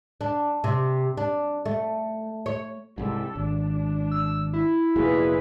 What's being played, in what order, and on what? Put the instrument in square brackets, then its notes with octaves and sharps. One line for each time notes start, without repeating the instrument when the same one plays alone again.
[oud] D4
C3
D4
A3
C#5
[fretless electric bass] C2 G#2 [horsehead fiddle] G3 A4
[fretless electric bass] G#1 [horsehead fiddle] D4
[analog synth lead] E6
E4
[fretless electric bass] F1 A#2 [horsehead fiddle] D#4 B4 [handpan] F4 F#4 G#4